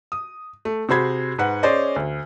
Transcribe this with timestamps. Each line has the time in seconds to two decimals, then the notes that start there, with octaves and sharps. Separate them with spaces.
0.12 D#6
0.65 A3
0.89 C3 F#4 G#4 C5 B5 G#6
1.38 G#2 B4 F#5
1.63 C#4 G#4 C5 D5 D#5
1.96 D2